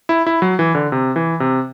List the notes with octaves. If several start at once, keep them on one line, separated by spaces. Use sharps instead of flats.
E4
E4
F#3
E3
D3
C3
E3
C3